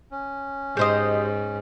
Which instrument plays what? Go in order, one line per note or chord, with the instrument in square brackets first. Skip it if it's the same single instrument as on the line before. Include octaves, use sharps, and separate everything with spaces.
[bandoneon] C#4
[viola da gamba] G#2 [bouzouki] G4 C5 D#5